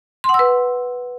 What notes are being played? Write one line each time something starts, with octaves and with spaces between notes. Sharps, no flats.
C6
F#5
E6
B4